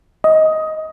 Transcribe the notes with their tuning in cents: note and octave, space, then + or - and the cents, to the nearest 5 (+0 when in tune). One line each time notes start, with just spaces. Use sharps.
D#5 +15